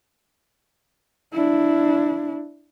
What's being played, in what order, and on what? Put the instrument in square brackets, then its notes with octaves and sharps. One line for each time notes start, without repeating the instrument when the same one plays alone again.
[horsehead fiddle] D4 E4